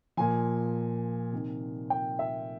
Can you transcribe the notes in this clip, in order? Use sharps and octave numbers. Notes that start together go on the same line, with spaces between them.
A#2 F3 G#5
C3 D#3
G5
E5